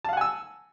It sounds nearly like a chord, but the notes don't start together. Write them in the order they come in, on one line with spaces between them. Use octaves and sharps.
A5 F5 F#5 G#5 E6